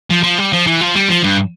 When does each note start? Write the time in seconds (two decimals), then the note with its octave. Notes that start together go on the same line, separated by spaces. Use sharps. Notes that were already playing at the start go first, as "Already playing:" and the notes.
0.11 F3
0.24 F3
0.38 G3
0.53 F3
0.67 E3
0.81 F3
0.95 G3
1.09 F3
1.23 G2